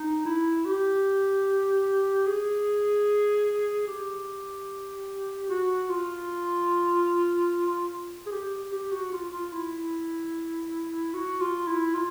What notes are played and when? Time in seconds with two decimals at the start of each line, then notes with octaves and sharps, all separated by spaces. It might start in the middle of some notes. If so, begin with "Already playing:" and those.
Already playing: D#4
0.25 E4
0.65 G4
2.26 G#4
3.87 G4
5.49 F#4
5.89 F4
8.26 G#4
8.32 G4
8.72 G4
8.92 F#4
9.12 F4
9.32 F4
9.53 E4
11.14 F#4
11.41 F4
11.67 E4
11.94 F4